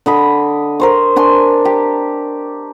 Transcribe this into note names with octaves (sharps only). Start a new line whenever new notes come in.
D3 D#5 B5
A#4 C5 C#6
D4 G#5 C6 C#6
G4